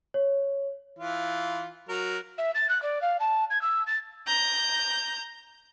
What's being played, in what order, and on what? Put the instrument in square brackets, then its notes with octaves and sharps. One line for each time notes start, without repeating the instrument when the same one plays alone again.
[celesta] C#5
[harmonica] E3 F4
F#3 A#4
[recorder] E5
A6
F#6
D5
F5
A5
G#6
E6
A6
[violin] A#5 G6